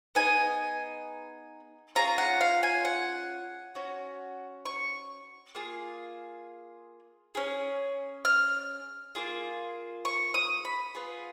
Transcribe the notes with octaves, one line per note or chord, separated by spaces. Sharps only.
B3 D#4 G#4 G#5
C#4 F4 G#4 A#5
F#5
F5
G#5
F#5
C#4 F#4
C#6
A#3 F4 G#4
C#4 G#4
F6
A#3 F4 G#4
C#6
D#6
B5
B3 F4 G#4